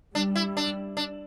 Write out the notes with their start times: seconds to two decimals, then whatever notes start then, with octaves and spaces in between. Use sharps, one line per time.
0.15 G3 D4
0.35 E4
0.57 D4
0.97 D4